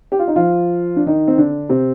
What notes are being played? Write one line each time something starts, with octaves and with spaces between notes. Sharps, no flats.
G4
F4
D#4
F3 F4
D4
D#3 D#4
C4
D3 D4
C3 C4